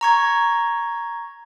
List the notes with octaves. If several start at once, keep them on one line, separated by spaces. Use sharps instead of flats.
A#5 C#6 G#6